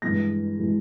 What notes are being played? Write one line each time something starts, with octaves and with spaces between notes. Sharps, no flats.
G2 E3 G#3 A#6
E3 G#3